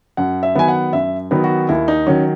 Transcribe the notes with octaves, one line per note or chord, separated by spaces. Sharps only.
F#2 F#5
E5
D#3 F#3 B3 G#5
F#5
F#2 E5
D#3 F#3 B3
F#4
D#2 E4
D#4
D#3 F#3 C#4